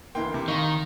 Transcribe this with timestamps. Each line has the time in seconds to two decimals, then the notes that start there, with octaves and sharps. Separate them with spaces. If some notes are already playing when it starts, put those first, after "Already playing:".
0.15 D2 E3 A#3 G5 C6
0.34 C3
0.48 D#3 D#5 F5 C6 C#6